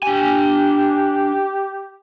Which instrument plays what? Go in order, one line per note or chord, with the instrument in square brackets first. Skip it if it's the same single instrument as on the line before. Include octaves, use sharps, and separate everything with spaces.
[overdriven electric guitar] D4 G#5 [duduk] G4